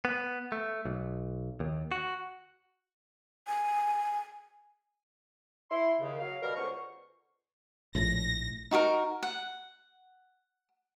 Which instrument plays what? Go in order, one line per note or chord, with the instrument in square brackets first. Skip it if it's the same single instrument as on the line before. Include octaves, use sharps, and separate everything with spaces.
[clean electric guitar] B3
A3
B1
D#2
F#4
[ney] G#5
[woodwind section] E4 C6
D#2 C#3
F#3 F5
B2 G3 A#4
C#2 D3 B3 C5 C#6
[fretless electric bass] A#1 A2 [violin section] A#6
[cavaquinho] D#4 F#4 G#4 A#4
F#5